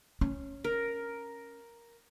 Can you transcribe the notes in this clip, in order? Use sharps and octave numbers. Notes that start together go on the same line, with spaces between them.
C#4
A#4